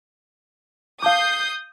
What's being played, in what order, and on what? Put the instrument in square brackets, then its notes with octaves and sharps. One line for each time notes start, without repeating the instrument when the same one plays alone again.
[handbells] F5 A5 D6 [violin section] D#6 G6 C7